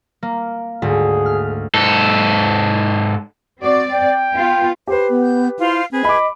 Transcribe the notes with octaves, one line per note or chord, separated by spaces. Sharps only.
A#3
D2 G#2 G#4
F6
G#2 A4
C4 F#4 D5 D6
G5
B3 F4
G4 B4 C5
B3
G6
E4 F4 C5 F5
C4 G#4 B4
D#5 B5 D6